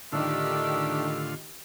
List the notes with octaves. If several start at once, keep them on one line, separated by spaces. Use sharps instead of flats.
A2 D3 D#3 A3 D4 F4 G4 E6